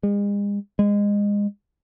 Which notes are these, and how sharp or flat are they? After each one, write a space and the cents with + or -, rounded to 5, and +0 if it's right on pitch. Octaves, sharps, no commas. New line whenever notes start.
G#3 -40
G#3 -25